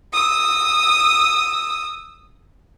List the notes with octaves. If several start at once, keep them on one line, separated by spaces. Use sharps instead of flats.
D#6 E6